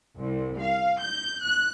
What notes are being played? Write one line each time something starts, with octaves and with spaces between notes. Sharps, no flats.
C2
F5
G6
F#6